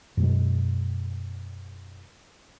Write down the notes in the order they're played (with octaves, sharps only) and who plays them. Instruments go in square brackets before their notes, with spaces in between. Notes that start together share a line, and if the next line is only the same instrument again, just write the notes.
[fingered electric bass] F#2 B2 G#3